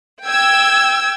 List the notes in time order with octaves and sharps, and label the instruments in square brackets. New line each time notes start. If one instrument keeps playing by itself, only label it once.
[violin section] G5 E6 G#6